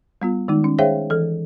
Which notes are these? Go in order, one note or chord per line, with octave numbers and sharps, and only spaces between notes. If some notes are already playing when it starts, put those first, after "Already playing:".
G3 B3 F4
D#3 G#3 D#4
C#4
G#4 C5 C#5 E5 F5 G5
E3 A4